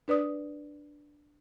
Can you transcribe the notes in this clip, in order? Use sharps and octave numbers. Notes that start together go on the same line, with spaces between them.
D4 B4 D5 D#6